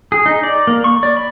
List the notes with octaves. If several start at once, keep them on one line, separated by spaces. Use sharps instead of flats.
G#4
D#4
D5
A#3
C#6
D5
B5